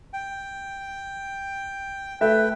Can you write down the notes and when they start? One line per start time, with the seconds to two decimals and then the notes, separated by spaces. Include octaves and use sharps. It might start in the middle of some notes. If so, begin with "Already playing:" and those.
0.13 G5
2.21 A3 B4 E5 G5